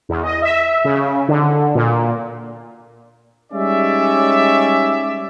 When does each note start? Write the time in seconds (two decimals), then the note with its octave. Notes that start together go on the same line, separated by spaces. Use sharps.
0.09 E2
0.23 D#5
0.42 E5
0.85 C#3
1.28 D3
1.75 A#2
3.52 G3 G#3 C#4 D#4 D5 E5